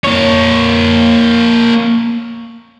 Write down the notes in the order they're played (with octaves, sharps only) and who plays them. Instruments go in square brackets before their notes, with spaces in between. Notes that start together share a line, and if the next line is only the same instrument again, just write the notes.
[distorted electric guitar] A#3 C#5